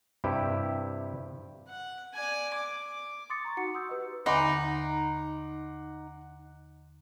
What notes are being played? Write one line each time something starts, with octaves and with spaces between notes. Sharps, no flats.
G2 C3 E4 G4
F#5
D5 G#5
D6
C6 D6 D#6 A6 C#7
A#5 C6 C#6
D#4 F#4 F#5 C#7
C6 D#6 E6 G6
G4 B4 D#5
D#2 D3 D#4 F#5 B5 C6 D6